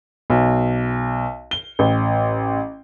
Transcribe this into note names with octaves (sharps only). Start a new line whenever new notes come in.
B1
G7
A1